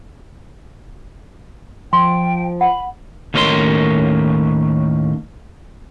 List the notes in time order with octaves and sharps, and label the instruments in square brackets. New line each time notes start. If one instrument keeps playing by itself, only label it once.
[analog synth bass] F3 [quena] G5 [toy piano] C6
[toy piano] F#5 [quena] B5
[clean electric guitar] D#2 A2 C#4 A#4 C#5 C6